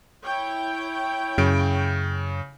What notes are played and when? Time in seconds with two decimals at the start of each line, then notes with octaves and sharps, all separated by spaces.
0.24 E4 C#5 G5
1.38 F#2 C#3 D7